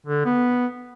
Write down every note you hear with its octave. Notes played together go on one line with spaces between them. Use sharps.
D3
B3